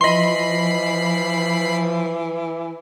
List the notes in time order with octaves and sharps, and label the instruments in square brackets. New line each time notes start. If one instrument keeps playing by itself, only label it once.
[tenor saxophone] E3 [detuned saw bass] F3 [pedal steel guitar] D#5 C6 [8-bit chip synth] B5 C7